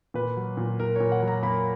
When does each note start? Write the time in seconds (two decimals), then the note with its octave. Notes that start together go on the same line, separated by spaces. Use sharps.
0.14 A#2 B4
0.37 F#3
0.57 A#2
0.80 A#2 A#4
0.96 A#2 C#5
1.12 F#5
1.22 F#3
1.28 A#5
1.43 A#3 B5